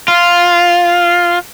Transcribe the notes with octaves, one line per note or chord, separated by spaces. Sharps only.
F4